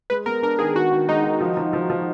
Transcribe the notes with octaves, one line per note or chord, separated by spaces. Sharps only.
G#3 B4
B3 A#4
D4 A#4
D#3 G#4
D#3 F#4
D#3
G#3 D#4
D#3
F3
F3
F3
F3